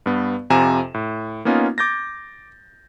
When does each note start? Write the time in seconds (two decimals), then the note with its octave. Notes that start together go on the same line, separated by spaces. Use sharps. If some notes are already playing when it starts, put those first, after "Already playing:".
0.06 G2 B3
0.50 F2 C3 F4 G#5 A#5 E7
0.94 A2
1.45 A#3 B3 C#4 D#4 F4
1.78 D6 G6 A6 A#6